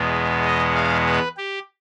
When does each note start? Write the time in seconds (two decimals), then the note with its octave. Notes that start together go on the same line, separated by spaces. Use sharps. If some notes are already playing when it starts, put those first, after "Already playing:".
Already playing: E2 B2 G#3 B3
0.45 D#5
0.75 F5
1.07 B4
1.37 G4